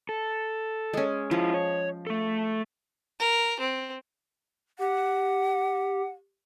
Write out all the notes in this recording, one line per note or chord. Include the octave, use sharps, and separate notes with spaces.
A4
G#3 C#4
F3 E4 F4
C#5
A3 A4
A#4
C4
G4 F#5